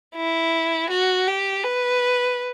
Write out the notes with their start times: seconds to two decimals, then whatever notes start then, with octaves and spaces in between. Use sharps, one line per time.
0.16 E4
0.90 F#4
1.27 G4
1.64 B4